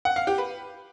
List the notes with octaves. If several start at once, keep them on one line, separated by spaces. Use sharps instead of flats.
F#5
F5
G4
B4